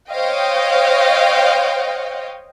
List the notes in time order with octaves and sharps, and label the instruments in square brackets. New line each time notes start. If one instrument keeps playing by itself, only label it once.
[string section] C5 C#5 D#5 F5 G5